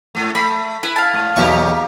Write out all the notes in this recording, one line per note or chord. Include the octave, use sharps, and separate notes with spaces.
G#2 A3
A3 B5
E4 B4
F5 A5
G#2
B1 E2 A#3 D#4 G4 C#6